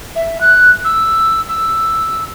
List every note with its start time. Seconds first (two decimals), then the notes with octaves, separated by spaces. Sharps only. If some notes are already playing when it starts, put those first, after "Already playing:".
0.15 E5
0.40 F#6
0.84 E6
1.48 E6